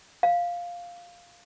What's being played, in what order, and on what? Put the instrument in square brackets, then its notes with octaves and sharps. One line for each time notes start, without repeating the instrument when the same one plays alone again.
[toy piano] F5